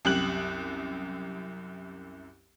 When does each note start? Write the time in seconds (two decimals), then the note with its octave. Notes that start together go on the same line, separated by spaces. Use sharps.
0.05 C2 F#2 G4 F#6 F#7